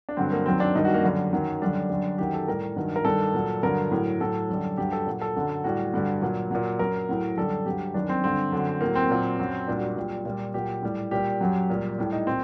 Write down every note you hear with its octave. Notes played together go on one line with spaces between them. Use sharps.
D4
G2 D3 F#3 C4
A#3
F#2 D#3 F#3 C4
D4
G2 D#3 G3 D#4
F#4
A#3
F#2 D3 G3
F#2 D#3 F#3
F#2 D3 G3 D4
F#2 D3 G3
F#2 D#3 F#3 G4
A4
A2 G3 A#4
G2 D#3 F#3
A#4
G2 D#3 G3 A4
A#2 F#3
G2 D3 F#3 A#4
A2 F#3
A2 F#3 A4
F#2 D3 G3
G2 F#3 G4
A4
A#2 F#3
A4
F#2 D3 F#3
A2 G3 F#4
G2 D3 G3
A#2 F#3
A#2 F#3
F#2 F#3 A#4
A2 F#3
F#2 D3 G3 A4
G2 F#3 G4
F#2 D#3 G3 D4
C4
G2 D3 G3 C4
F#2 D3 F#3
A2 F#3 A#3
C4
A#2 F#3
F#2 F#3
A#2 G3 D4
F#4
G4
A#2 G3
A#2 G3
A#2 F#3 G4
A2 G3
A#2 G3 G4
F#2 F#3
A#2 G3
A2 G3
D#4
A#2 C4